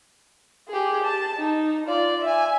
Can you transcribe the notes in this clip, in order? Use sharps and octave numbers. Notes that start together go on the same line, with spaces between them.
G4 G#4
A5
D#4
F4 D5
E5 G#5